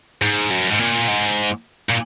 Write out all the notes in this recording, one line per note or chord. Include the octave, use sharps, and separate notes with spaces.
G#2
F#2
G#2
A#2
G#2
A#2